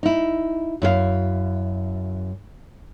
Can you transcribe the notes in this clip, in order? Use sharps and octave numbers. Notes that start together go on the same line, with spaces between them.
D#4 E4
F#2 E4 A4 F5